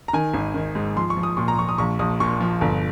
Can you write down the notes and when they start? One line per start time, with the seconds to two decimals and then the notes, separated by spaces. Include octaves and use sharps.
0.08 A#5
0.13 D#3 G#5
0.34 G#1
0.54 D#3
0.75 G#2
0.96 F3 C6
1.10 C#6
1.17 F3
1.23 D#6
1.37 A#2 C#6
1.48 A#5
1.58 F3 C#6
1.69 D#6
1.78 A#1 C#6
1.99 A#1 D#6
2.20 A#2 C#6
2.41 F3
2.61 G1